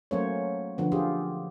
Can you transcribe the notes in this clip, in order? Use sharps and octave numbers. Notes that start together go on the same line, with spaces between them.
F#3 A3 A#3 C#4 C5 C#5
D3 F3 B3
F4 G4 G#4